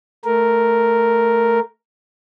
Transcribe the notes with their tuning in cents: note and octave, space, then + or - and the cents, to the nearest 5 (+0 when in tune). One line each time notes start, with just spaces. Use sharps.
A3 +0 A#4 +0